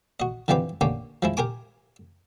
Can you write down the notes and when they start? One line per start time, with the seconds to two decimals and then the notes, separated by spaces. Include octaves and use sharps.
0.20 F#4 D#5
0.48 D3 E3 F3 C4 G4 B4
0.81 D3 A#3 C#4 G4
1.22 F3 G#3 E4
1.37 G4 A#4 G#5 D6